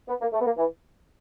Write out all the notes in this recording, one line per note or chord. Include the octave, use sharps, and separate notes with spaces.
B3
A#3
A3
B3
A#3
E3